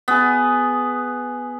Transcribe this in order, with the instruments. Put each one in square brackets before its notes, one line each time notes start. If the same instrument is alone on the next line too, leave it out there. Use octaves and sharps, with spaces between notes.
[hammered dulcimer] B3 G#4